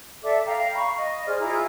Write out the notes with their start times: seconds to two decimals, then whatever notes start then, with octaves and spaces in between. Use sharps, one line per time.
0.23 A4 D5 E5 D6
0.46 F5 G5 A#5
0.73 F5 B5 C#6
0.97 D#5
1.26 G#4 C5 D5 F6
1.40 E4 F4 G#4 A#5